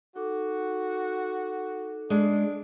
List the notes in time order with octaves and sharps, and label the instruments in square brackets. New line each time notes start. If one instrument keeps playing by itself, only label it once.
[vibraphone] D#4 A4 D6 [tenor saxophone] F#4
[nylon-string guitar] G#3 [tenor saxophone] D4